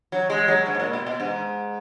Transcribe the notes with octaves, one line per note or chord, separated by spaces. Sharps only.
F#3
G#3
F#3
G#2
B2
A#2
B2
B2
G#2